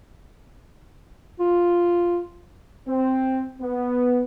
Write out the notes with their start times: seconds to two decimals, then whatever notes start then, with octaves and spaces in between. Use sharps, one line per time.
1.40 F4
2.87 C4
3.61 B3